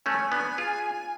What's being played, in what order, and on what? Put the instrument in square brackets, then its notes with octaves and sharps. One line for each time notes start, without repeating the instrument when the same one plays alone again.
[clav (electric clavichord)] A3 C#4 [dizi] G#5
[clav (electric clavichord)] B3 D4
F4 G#4